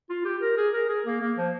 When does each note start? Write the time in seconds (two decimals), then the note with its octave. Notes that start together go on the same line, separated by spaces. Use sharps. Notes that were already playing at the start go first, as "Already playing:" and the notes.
0.10 F4
0.25 G4
0.41 A#4
0.57 G#4
0.73 A#4
0.89 G#4
1.06 A#3
1.21 A#3
1.38 F3